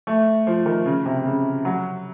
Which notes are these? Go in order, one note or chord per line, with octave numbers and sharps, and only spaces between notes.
A3
F3
D#3
C#3
C3
C#3
F#3